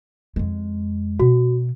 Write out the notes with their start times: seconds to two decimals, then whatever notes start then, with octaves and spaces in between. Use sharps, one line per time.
0.36 F2 G#3
1.19 B2 F#4